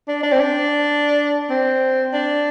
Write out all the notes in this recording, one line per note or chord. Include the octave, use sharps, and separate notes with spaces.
D4
D4
C4
D4
C4
D4